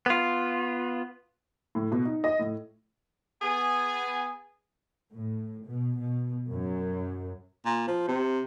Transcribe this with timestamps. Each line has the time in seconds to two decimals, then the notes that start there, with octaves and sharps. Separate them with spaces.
0.06 B3 F4
1.75 A2
1.92 B2
2.05 D#4
2.24 D#5
2.39 A2
3.42 B3 G#4 G#5
5.13 A2
5.67 B2
5.98 B2
6.52 F#2
7.66 A#2
7.87 F3
8.08 C3